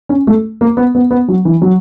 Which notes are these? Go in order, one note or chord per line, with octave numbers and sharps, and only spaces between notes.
C#4
A3
A#3
B3
B3
B3
F#3
E3
F#3